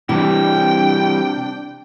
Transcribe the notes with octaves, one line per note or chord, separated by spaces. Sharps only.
C3 E3 G3 D4 G5